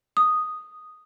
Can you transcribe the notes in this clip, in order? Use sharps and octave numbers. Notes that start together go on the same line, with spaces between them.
D#6